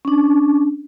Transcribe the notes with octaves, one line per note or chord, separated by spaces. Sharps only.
C#4 D4